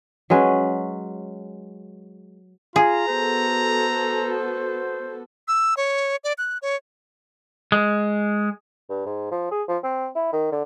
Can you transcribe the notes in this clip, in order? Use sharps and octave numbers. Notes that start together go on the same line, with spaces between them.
F#3 G#3 C#4 B4
F4 G#4 A#5
B3 F#4 A4 C5
E6
C#5
D5
F#6
C#5
G#3
G2
G#2
F3
G#4
F3
C4
E4
D#3
D3